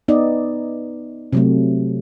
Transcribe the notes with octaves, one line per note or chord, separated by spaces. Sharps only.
B3 D#4 D5 D#5
C3 F#3 A3